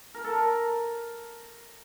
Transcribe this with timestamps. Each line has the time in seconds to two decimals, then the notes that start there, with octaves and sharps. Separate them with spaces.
0.14 A#4
0.24 A4
0.32 A#4